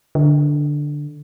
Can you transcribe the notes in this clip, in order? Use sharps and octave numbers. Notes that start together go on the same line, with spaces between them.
D3